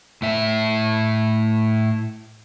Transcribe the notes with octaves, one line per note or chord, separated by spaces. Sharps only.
A2 E5